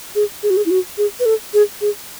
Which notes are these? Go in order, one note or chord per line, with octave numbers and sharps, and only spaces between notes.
G#4
G#4
F#4
G#4
E4
F#4
G#4
B4
A4
G#4
G#4